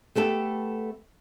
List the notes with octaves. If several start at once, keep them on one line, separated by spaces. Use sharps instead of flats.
A3 B3 G4 A4